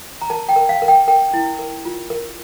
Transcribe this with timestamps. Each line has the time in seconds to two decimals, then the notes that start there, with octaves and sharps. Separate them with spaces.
0.22 A#5
0.30 A#4 A5
0.49 G5
0.56 A#4
0.69 F5
0.82 A#4
0.88 G5
1.08 A#4 G5
1.34 E4
1.59 A#4
1.85 F4
2.10 A#4